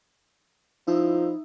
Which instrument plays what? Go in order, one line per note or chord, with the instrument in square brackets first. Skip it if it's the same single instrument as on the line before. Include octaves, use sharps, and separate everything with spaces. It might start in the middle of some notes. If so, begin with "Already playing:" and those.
[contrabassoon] F3 [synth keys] D#4 E4